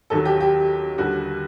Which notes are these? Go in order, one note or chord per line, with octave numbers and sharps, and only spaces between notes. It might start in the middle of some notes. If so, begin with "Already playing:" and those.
D#2 D#3 F#3 A4
G4
G4
D#2 D3 G3 F#4